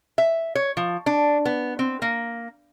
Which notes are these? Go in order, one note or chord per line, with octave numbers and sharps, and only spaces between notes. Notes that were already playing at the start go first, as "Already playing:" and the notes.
E5
C#5
F3
D4
B3
C4
A#3